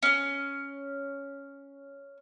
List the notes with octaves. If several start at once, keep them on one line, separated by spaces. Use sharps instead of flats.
C#4 F6